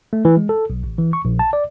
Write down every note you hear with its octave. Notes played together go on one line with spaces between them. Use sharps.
A3
E3
G#3
A4
B1
A1
E3
C#6
A#1
A5
D5